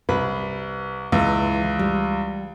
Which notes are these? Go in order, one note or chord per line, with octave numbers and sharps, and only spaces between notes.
C2 B4
C#2 E3
G3